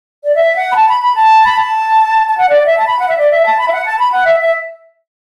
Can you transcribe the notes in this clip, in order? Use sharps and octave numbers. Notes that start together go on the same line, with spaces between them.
D5
E5
F#5
B5
A5
B5
B5
A5
B5
A5
A5
F#5
D5
E5
A5
B5
F#5
E5
D5
E5
A5
B5
E5
F#5
A5
B5
F#5
E5
E5